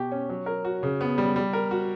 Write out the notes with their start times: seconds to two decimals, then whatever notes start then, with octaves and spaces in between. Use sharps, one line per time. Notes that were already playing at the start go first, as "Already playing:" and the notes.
Already playing: B2 G4
0.12 C#4
0.29 F#3
0.46 A#4
0.65 F#4
0.83 C#3
1.01 B3
1.18 G3
1.36 G3
1.53 A#4
1.71 F#4